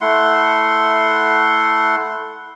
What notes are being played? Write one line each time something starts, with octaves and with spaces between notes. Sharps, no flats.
A3 E4 F#5 C6